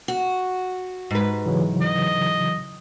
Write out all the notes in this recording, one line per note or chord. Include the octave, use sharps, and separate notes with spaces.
F#4
G#2 B4
C#3 E3 F#3
D#5